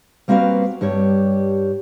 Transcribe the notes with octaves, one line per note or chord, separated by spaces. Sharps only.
G3 A#3 C4 F#4 B4 F5
G2 G3 G4 C#5